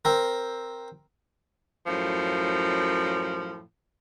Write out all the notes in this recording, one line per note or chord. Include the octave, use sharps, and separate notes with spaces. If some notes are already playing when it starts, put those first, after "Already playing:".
C4 A#4
F#2 A2 F3